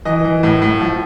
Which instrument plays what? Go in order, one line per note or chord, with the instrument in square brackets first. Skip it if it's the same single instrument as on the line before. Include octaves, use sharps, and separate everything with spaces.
[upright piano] E3 D#5
E3
A2
A2
F3